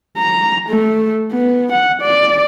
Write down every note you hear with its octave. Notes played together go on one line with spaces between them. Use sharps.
A#5
A3
B3
F#5
D5